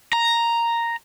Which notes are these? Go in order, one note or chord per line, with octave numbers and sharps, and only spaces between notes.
A#5